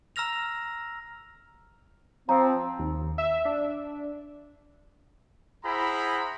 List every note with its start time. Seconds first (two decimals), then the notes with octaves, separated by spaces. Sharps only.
0.16 A#5 E6 F6 A#6 F7
2.29 F3 C4 A#5
2.79 D#2
3.18 E5
3.45 D4
5.64 E4 G#4 C5 F#5 A#5 B5